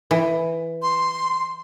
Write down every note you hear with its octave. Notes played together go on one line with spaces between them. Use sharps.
E3
C6